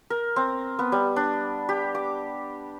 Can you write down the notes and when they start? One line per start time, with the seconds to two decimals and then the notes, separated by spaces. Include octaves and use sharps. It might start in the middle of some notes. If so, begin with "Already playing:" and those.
0.10 A#4
0.36 C4
0.79 B3
0.92 G3
1.16 D4
1.69 G4
1.95 D6